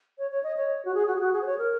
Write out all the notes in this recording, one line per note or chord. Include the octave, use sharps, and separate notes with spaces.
C#5
C#5
D#5
C#5
F#4
G#4
F#4
G#4
F#4
G#4
C5
C#5
A#4